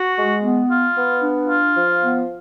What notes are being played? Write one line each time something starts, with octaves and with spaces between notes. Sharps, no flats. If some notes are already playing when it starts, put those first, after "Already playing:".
Already playing: F#4
G#3
B3
F4
B3
D4
F4
F3
B3